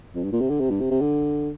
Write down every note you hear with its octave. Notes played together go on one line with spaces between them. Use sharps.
F2
G2
A#2
C3
D3
C3
G2
C3
C3
D3